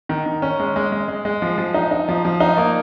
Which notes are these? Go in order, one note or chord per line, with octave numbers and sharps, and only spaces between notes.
D#3
D#3
C#4
G#3
G#3
G#3
G#3
G#3
F3
F3
D#4
D#4
F3
F3
D#4
A#3